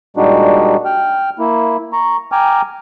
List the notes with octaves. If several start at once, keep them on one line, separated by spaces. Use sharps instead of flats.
A#2 G3 G#3 D4 D#4 F#4
G5 F6
A#3 E4
A#5 C#6
G5 G#5 A#5 D6 F6